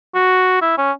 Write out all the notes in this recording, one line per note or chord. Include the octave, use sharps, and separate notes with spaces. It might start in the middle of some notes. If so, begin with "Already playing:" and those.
F#4
E4
C#4